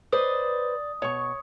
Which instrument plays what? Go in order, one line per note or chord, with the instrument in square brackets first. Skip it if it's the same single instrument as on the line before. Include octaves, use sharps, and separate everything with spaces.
[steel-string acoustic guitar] B4 C5 D#5 [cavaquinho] D5 [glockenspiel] D#6
[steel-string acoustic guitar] B2 [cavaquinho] C#5 C#6